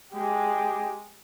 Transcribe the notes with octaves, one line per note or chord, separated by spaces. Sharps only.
G#3 G4